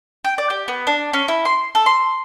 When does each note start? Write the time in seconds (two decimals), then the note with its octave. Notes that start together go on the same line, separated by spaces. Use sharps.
0.24 G5
0.38 D5
0.50 G4
0.68 B3
0.87 D4
1.13 C#4
1.28 E4
1.45 C6
1.75 A4
1.86 C6